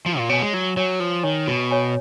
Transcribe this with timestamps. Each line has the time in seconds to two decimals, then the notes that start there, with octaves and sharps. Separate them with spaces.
0.06 F3 F#4
0.18 A#2
0.29 B2 C#5 G#5
0.42 G#3
0.53 F#3 F#4
0.77 F#3 C#5 G#5
1.00 F3 F#4
1.23 D#3 C#5 G#5
1.47 B2 F#4
1.71 C#5 G#5